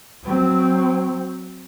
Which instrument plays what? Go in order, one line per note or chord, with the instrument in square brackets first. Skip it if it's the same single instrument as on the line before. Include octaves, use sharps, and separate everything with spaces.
[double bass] F#3 C4